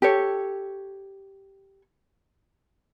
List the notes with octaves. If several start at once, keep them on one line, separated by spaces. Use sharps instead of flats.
G4 A4 C#5